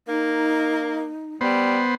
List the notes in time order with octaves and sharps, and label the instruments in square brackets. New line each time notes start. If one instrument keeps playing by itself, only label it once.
[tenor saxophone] A#3 [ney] D#4
[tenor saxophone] G3 [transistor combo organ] B3 C5